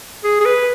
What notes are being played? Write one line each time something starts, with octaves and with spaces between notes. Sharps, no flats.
G#4
G#4
B4